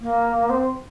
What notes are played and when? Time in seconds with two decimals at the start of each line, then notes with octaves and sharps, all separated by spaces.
0.01 A#3
0.49 C4